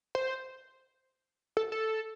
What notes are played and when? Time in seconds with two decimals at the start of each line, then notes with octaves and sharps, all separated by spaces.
0.15 C5
1.57 A4
1.72 A4